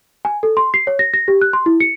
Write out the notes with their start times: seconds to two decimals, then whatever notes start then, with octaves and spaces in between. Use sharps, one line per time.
0.25 G#5
0.43 A4
0.57 C6
0.74 C7
0.87 C#5
0.99 A#6
1.14 A#6
1.28 G4
1.42 F#6
1.53 C6
1.66 E4
1.80 C#7